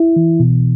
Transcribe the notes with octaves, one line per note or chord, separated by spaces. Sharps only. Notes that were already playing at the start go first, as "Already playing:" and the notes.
Already playing: E4
E3
B2